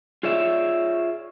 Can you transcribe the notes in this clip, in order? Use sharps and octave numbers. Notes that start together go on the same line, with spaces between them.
F4 G#4 C#5 D5 E5